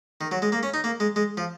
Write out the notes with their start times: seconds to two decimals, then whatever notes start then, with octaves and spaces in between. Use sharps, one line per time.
0.21 D#3
0.31 F#3
0.42 G#3
0.52 A#3
0.63 C#4
0.74 D#4
0.84 A#3
1.00 G#3
1.16 G#3
1.37 F3